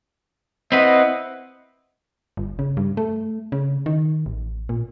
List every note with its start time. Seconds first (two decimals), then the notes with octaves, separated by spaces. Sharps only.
0.72 C4 E4 B4 D#5 F#5
2.37 G1
2.59 C#3
2.77 G2
2.97 A3
3.52 C#3
3.86 D#3
4.26 A1
4.69 A#2